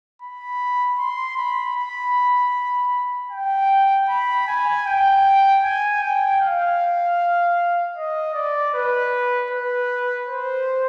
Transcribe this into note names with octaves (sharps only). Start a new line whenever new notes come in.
B5
C6
B5
B5
G5
B5
G#5
G5
G#5
G5
F5
D#5
D5
B4
B4
C5